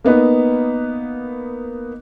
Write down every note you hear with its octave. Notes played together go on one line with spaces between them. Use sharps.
A#3 B3 D#4 B4